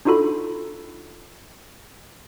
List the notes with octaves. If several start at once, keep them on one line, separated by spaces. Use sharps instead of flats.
D4 D#4 F4 F#4 A4 B5